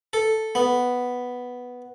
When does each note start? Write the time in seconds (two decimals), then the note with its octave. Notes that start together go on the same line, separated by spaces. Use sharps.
0.13 A4
0.55 B3